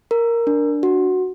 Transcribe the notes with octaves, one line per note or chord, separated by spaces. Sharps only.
A#4
D4
F#4